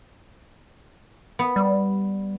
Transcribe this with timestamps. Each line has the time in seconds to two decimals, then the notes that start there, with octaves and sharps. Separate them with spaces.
1.39 B3
1.56 G3